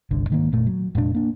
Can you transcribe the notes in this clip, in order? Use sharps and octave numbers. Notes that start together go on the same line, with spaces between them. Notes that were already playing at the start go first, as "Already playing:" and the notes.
G1 C2 D3
G#2 D#3 A#3
F1 A#2 A3
F#3
F1 A#2 G#3 D4
A#3 D4